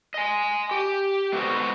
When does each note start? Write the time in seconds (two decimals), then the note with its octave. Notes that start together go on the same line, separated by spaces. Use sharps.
0.14 D#5 G#5
0.71 G4
1.33 G#3 B3 F#4 A4 C5